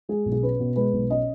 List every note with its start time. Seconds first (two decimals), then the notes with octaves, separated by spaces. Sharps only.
0.09 G#3 G#4
0.26 B1
0.32 G#4
0.43 C#4 B4
0.60 B2
0.76 G#3 B4
0.93 B1
1.10 C#4 D#5